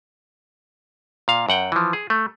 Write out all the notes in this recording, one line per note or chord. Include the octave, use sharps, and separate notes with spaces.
A#2 F5
F#2 F#5 G5
E3 F3
G#4
A3